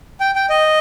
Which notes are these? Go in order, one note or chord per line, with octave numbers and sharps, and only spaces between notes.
G5
G5
D#5